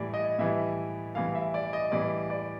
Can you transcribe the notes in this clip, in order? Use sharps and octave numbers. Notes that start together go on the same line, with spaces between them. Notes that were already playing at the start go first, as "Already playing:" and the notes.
Already playing: A2 E3 G3 D5
D#5
A2 E3 G3 E5
A2 E3 G3 F5
E5
D5
D#5
A2 E3 G3 D5
D5